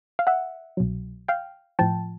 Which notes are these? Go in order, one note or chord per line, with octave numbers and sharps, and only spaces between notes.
F5
E5 F#5
C2 B2 F#3
F5 G5
A2 F3 G5 A5